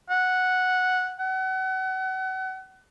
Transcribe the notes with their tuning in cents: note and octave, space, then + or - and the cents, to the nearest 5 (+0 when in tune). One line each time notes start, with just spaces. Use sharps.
F#5 -5
F#5 +35